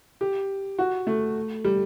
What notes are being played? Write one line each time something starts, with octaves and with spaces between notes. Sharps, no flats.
G4
F#4
A3
G3